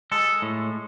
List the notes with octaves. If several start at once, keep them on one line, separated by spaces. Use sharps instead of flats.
G#3 A4
A2